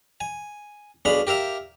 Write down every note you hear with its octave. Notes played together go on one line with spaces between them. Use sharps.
G#5
B1 D4 G#4 F5 B5
G4 A#4 E5 F5